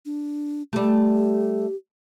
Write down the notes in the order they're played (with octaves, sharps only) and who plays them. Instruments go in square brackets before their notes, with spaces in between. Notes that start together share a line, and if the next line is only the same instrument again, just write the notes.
[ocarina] D4
[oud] G3 A3 [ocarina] G4